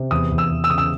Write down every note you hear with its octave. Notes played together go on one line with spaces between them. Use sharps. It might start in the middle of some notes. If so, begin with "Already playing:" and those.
Already playing: C3
E2 D#6
E2
E6
E2
E6
C#3 D#6
E6